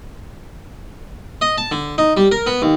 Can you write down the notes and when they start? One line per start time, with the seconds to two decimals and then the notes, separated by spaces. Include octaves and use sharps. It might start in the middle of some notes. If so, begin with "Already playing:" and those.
1.41 D#5
1.58 A5
1.72 D3
1.98 D#4
2.17 G3
2.32 A#4
2.47 B3
2.62 D#2